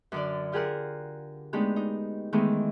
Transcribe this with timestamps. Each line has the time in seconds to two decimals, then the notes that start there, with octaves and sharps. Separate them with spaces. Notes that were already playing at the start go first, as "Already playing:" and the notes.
0.12 F#2 D3 D5
0.52 F4 G4 G#4 A#4 F#5
1.53 G#3 A3 B3 D4 D#4 G4
1.76 D#4
2.33 D#3 E3 G#3 A3 B3